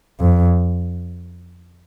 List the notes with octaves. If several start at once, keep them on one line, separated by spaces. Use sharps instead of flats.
F2